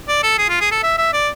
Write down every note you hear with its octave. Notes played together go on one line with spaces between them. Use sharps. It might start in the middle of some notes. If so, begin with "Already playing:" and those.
D5
A4
G#4
F4
G#4
A4
E5
E5
D5